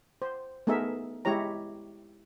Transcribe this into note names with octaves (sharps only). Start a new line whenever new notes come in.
C5
A3 B3 D#4 G#4 A#4 E5
G#3 E4 G4 C#5 A#5